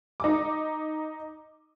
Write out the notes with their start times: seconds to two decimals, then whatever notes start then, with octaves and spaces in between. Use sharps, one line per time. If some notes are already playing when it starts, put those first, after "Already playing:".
0.20 D#4 D6